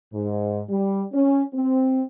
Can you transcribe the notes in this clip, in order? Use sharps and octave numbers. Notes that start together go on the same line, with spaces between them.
G#2
G3
C#4
C4